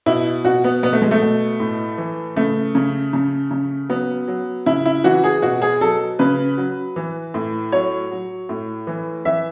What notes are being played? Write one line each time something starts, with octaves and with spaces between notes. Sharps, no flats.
B2 E4
B2 F#4
B3
B2 B3
A3
G#3
A3
B2
A2
E3
C#3 A3
C#3
C#3
C#3
F#3 B3
F#3
C#3 E4
E4
E3 F#4
G#4
B2 F#4
G#4
F#3 A4
C#3 B4
F#3
E3
A2
F#3 C#5
F#3
A2
E3
E3 E5